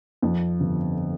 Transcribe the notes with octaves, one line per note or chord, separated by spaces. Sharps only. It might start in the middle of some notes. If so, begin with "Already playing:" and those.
F2
G1